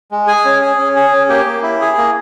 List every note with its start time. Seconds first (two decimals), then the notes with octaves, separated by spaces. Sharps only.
0.11 G#3
0.27 G#4 G#5
0.45 C#4
0.61 G#4
0.79 C#4
0.96 G#4
1.13 C#4
1.29 A#3 G4 G5
1.46 A#3
1.63 E4
1.81 G#4
1.98 A#3